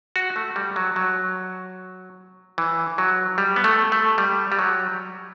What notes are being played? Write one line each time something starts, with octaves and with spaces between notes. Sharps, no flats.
F#4
A3
G3
F#3
F#3
E3
F#3
G3
B3
A3
A3
G3
G3
F#3